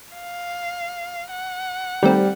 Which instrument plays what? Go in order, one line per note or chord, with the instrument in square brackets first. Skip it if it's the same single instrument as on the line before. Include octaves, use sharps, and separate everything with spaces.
[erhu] F5
F#5
[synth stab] D#3 A3 C4 [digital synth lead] G3